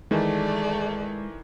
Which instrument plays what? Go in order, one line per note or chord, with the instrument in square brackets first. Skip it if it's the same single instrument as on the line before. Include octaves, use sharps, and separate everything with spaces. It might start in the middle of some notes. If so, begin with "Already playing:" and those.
[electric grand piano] D#3 E3 [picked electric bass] G#3 [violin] A3 D5